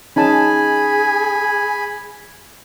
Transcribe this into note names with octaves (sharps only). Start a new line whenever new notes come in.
C#4 D#4 G#4 G#5 A5 B5